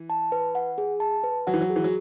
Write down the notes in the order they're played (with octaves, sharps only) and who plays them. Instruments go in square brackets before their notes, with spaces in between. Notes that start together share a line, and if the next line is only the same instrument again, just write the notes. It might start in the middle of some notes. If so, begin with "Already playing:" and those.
Already playing: [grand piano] E3
[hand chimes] A5
B4
F#5
G#4
A5
B4
[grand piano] F#3 [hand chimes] F#5
[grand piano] E3
F#3
[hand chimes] G#4
[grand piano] E3
F#3